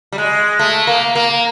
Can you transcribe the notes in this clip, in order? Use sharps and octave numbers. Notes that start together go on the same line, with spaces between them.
G3
G#3
A3
A#3
A#3